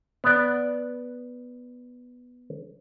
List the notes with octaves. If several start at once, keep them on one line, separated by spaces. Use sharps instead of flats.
B3 D5